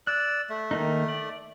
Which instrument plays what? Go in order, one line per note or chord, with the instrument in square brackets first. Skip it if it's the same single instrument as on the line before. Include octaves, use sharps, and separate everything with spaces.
[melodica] D5 E6 [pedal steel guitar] F#6
[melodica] A3
[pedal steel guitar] D#3 A#3 D#4
D5